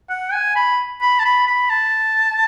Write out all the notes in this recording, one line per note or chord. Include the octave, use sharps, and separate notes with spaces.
F#5
G#5
B5
B5
A5
B5
B5
A5